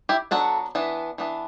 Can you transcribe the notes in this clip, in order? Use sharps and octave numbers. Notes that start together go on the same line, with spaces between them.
E4 G4
F#3 B3 D4 F#4 A4
E3 B3 D4
E3 B3 D4